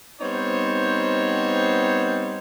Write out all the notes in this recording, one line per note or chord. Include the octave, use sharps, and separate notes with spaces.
G3 B3 C4 D#4 C5 C#5